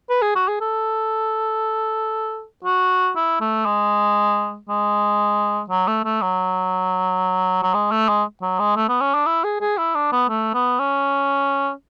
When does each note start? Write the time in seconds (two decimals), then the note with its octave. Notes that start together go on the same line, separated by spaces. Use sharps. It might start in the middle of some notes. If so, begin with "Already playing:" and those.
0.10 B4
0.22 G#4
0.35 F#4
0.48 G#4
0.61 A4
2.65 F#4
3.16 E4
3.41 A3
3.66 G#3
4.69 G#3
5.70 F#3
5.88 A3
6.05 A3
6.22 F#3
7.63 F#3
7.74 G#3
7.92 A3
8.09 G#3
8.42 F#3
8.59 G#3
8.76 A3
8.89 B3
9.01 C#4
9.14 D4
9.26 E4
9.44 G#4
9.60 G#4
9.78 E4
9.95 D4
10.12 B3
10.29 A3
10.54 B3
10.80 C#4